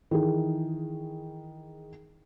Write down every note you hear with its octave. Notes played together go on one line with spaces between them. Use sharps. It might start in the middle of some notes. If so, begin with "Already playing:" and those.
D#3 E3 G#4